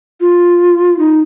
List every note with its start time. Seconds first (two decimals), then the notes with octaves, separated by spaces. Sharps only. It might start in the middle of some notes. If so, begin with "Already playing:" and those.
0.21 F4
0.99 D#4